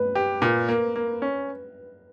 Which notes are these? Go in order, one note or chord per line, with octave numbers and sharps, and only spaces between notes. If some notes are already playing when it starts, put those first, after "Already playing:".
Already playing: B4
G4
A#2
A#3
A#3
C#4